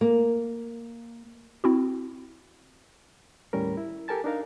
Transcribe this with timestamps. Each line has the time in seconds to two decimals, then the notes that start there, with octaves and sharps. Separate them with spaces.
0.01 A#3
1.64 C4 E4 F#4
3.53 D#2 A2 G3 C#4 A#4
3.77 E4
4.08 G4 A4 A#4 G#5 A5 A6
4.24 D4 D#4 A#4 F5